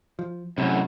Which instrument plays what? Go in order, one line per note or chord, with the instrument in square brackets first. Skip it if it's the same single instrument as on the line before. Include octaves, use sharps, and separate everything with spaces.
[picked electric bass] F3
[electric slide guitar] F#2 A2 [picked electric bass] C3